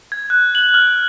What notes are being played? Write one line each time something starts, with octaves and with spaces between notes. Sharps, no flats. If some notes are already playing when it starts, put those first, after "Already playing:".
G#6
F#6
F#7
F6